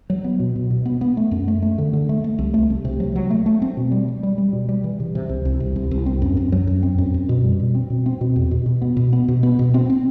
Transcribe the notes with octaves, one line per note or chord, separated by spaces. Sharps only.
F#3
B3
B2
B2
B2
B3
B3
A3
F#2
A3
A3
D3
D3
A3
A3
C2
A3
C2
C3
F#3
F#3
A3
A3
C4
B2
G3
G3
G3
G3
B2
G3
E3
C3
C3
C2
C2
C3
C2
C2
C4
F#2
F#2
F#3
F#2
C4
F#2
F#2
B2
G3
B2
C4
B2
C4
B2
E2
B2
B2
B3
B2
B3
B2
B3
B2
C4
C4